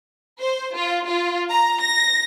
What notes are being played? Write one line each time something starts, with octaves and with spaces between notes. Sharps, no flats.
C5
F4
F4
A#5
A#6